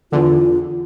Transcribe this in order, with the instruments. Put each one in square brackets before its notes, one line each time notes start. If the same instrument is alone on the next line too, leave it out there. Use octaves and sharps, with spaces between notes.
[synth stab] E2 D3 [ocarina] F4